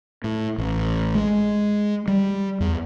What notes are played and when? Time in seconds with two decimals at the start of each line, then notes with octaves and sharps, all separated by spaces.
0.24 A2
0.58 A1
1.15 G#3
2.08 G3
2.60 E2